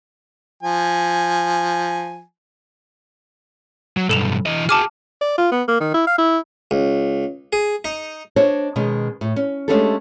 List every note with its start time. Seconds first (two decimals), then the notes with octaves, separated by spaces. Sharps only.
0.63 F3 G#5
3.97 F#3
4.09 B1 G2 A4 E7 F7
4.46 E3 D#5
4.69 F#4 G#4 A5 D6 F6
5.21 D5
5.38 F4
5.52 B3
5.68 A#3
5.80 D#3
5.94 E4
6.07 F5
6.18 E4
6.71 C#2
7.53 G#4
7.85 D#4
8.36 D4 C5 C#5 D#5
8.76 B2 D#3 G#3 C#4
9.21 A2
9.36 C#4
9.68 G#3 A3 C#4 D4 G4 A4